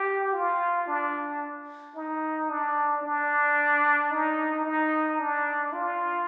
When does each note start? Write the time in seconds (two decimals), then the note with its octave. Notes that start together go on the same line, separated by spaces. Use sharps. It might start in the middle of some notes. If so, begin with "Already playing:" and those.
Already playing: G4
0.33 F4
0.87 D4
1.95 D#4
2.49 D4
3.03 D4
4.11 D#4
4.65 D#4
5.19 D4
5.73 F4